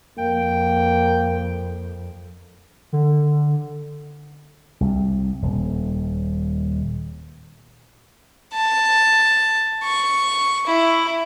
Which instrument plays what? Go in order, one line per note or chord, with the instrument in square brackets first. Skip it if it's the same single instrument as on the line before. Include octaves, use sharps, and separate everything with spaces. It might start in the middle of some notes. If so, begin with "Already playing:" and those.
[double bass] F2 [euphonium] A#3 [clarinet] G5
[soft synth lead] D3
[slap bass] C2
D#1
[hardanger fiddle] A5
C#6
E4